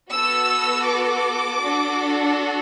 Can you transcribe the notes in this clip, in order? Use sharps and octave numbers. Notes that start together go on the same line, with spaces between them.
B3 F#4 A4 E6
D6
D4 F#4 A4